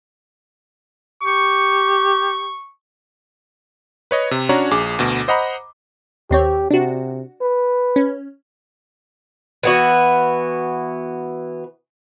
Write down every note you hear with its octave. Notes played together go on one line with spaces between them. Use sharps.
G4 C#6
B4 C#5 D#5
C3
C#4 D4 F#4 C#5 A#5
A#1 G#4 D6
D2 B2
C5 D#5 F#5 A#5 B5
D#2 C4 G4 C#5
C3 D4 F#4
B4
C#4
E3 B3 F#4